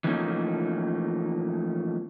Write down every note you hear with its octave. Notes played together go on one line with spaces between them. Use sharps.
E3 F3 A3 A#3 C#4 D#4